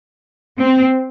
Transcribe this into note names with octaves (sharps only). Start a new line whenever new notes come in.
C4